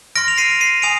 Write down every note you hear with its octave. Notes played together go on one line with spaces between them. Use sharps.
C6 F6 A#6 D7
F7
C7 D#7
C7 D#7
G#5 D#6 D7 F7